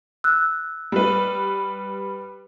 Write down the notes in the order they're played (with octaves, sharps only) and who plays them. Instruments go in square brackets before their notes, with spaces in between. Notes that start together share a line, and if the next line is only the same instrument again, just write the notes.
[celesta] E6 F#6
[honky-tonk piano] G3 B4